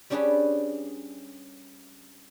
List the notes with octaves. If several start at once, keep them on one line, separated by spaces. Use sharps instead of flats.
G3 C#4 D4 G4 G#4 B4